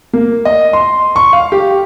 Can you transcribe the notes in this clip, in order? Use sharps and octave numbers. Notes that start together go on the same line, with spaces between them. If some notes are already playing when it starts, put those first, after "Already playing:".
A#3
D#5
C6
C#6
F5
G4